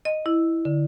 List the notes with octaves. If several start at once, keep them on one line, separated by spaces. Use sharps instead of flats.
D#5
E4
D3